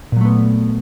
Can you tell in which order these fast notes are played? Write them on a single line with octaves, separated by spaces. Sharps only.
A#2 F#3 A3 B3